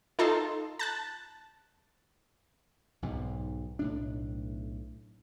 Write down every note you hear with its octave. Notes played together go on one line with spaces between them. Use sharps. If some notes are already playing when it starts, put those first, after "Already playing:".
D#4 F4 A4 A5 C6
A5 F#6 A6
B1 G#2 B2
B1 A2 D4